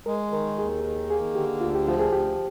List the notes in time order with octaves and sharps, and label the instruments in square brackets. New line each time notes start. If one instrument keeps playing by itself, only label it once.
[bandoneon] G#3 [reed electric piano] A#4
[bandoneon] D#3 [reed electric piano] A#4
[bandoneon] D#2 [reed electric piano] G#4
[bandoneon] D#3
[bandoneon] A#3 [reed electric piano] G#4
[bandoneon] D3 [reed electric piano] G4
[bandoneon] D2 [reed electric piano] F4
[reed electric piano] G4
[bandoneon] F3 [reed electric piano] F4
[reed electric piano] G#4
[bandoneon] D2 [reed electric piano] G4